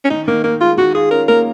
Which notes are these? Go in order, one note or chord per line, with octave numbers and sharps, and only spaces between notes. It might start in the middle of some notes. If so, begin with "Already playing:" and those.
C#4
D#3 D#4
D#3 A#3
A#3 D#4
G#3 F4
D#3 F#4
F4 G#4
C#4 A#4
A#3 A#4